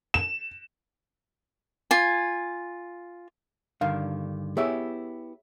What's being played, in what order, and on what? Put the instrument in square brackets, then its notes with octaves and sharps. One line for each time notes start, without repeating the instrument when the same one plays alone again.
[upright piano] E7
[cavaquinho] F4 G#5
[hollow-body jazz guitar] G2 D3 D#3 [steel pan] F5
[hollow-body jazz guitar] B3 E4 G4 [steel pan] G#4 C#5 E5